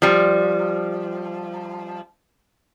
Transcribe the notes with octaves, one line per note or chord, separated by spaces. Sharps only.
F3 G3